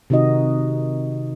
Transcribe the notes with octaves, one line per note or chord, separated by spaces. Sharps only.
C3 D#3 D#4 F#4 D#5